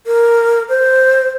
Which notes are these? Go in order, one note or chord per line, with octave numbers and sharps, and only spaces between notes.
A#4
C5